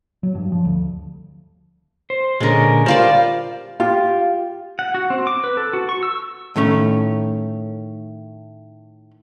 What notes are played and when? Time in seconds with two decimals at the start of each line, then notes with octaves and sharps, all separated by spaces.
0.23 F#3
0.35 G2
0.52 F3
0.65 D2
2.10 C5
2.40 A#2 D3 G#3 C#4 A#4
2.86 G3 F4 A#4 C5 D5
3.80 F4 G4
4.79 F#5
4.94 F#4
5.10 C4
5.27 D6
5.44 B4
5.57 A4
5.73 F#4
5.89 C#6
6.03 E6
6.56 A2 D#3 A3 C#4